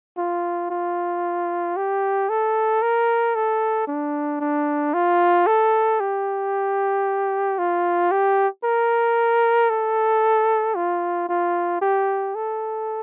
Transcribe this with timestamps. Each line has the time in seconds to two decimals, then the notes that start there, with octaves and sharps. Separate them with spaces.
0.17 F4
0.70 F4
1.76 G4
2.29 A4
2.82 A#4
3.35 A4
3.88 D4
4.41 D4
4.94 F4
5.47 A4
6.00 G4
7.58 F4
8.11 G4
8.64 A#4
9.70 A4
10.76 F4
11.29 F4
11.82 G4
12.35 A4